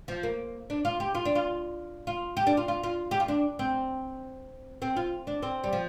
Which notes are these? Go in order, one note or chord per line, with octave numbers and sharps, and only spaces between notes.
F3
A#3
D4
F4
G4
F4
D4
F4
F4
G4
D4
F4
F4
F4
G4
F4
D4
C4
C4
F4
D4
C4
G3
F3